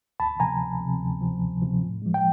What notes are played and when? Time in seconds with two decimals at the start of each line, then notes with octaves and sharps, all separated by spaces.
0.20 D2 A5 B5
0.40 C3 F3 G#5 A#5
0.60 D2
0.81 C3 F3
1.00 D2
1.21 C3 F3
1.41 D2
1.62 C3 F3
1.82 A2
2.02 F3 G#3
2.14 G5